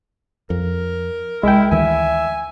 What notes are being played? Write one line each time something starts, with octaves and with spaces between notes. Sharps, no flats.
F2 A#4
C2 G#3 E4 G5
D2 D#3 E3 E5 G#5